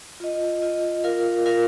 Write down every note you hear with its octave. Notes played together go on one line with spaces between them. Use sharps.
F4 D#5
F4 D#5
F4 A#4 F5
F4 A#4 F5